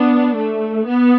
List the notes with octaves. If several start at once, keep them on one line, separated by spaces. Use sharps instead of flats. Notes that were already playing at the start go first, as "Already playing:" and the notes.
Already playing: B3 D4
A3
B3